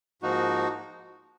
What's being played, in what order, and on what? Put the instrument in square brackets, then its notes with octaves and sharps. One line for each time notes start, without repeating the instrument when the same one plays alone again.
[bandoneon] G#2 F3 A#3 D#4 F#4